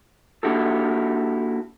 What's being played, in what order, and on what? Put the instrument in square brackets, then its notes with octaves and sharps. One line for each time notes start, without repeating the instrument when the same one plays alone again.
[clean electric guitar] A#3 D4 E4 F#4 G4 A4